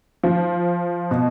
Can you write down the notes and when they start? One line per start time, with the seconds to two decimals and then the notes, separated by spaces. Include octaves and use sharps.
0.23 F3
1.11 B2